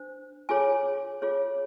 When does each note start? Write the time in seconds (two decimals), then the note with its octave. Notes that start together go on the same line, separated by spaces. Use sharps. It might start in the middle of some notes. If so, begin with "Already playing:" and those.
Already playing: D4 C5
0.49 F4 G#4 C#5 G#5
1.22 F4 G#4 C#5